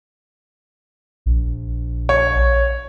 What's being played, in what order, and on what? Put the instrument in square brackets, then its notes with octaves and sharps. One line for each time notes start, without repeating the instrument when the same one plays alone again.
[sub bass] A#1
[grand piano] C#5